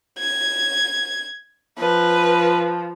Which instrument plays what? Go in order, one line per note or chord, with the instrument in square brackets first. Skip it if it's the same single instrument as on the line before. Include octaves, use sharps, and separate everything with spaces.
[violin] G#6
[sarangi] F3 [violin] B4